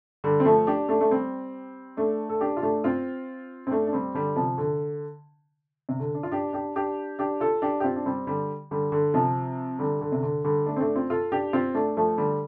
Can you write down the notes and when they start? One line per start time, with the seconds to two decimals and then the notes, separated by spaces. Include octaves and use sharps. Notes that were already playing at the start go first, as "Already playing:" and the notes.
0.24 D3 G3
0.40 C4
0.45 F3 A3
0.67 D4 G4
0.89 A3 D4
1.01 A3
1.11 G3 C4
1.97 A3 D4
2.29 A4
2.41 D4 G4
2.57 F4
2.63 A3 D4
2.84 C4 F4
3.67 C4
3.71 A3 D4
3.87 D4
3.93 G3 C4
4.14 D3 G3
4.36 C3 F3
4.58 D3
5.89 C3
6.00 D3
6.15 D4
6.23 F4
6.32 D4 G4
6.53 D4 G4
6.76 D4 G4
7.19 D4 G4
7.40 F4 A4
7.62 D4 G4
7.80 G4
7.84 C4 F4
7.96 D4
8.06 G3 C4
8.27 D3 G3
8.71 D3 G3
8.92 D3
9.14 C3 F3
9.79 D3 G3
10.01 D3
10.12 C3
10.23 D3
10.44 D3 G3
10.66 A3 D4
10.76 C4
10.80 A3 D4
10.96 C4 F4
11.10 F4 A4
11.32 D4 G4
11.53 C4 F4
11.75 A3 D4
11.97 F3 A3
12.18 D3 G3